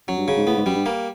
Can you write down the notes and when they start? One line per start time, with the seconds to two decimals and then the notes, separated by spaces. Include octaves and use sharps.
0.08 F#2 F#3
0.18 G2
0.28 C#3
0.37 G#2
0.47 A2 B3
0.57 G#2
0.66 F#2 G3
0.75 G2
0.86 A#3